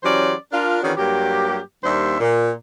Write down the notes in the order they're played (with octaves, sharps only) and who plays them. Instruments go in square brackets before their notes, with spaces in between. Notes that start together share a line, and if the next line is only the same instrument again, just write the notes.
[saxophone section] E3 F#3 C#4 G4 C5 D5
D4 F4 A#4
D#3 E3 C#4 D4 F#4 G#4
G2 F#3 A#3 G4
D#2 G3 A#3 D4 C5 E5
A#2